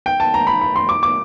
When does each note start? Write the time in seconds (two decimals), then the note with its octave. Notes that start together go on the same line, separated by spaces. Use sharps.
0.06 G5
0.20 A5
0.34 A#5
0.47 B5
0.61 B5
0.76 C6
0.89 D6
1.03 D6